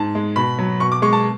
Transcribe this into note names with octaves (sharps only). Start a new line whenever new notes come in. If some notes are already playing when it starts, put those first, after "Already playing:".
Already playing: G#2 A5
G#3
B2 B5
F#3
B2 C#6
D6
G#3 C#6
A5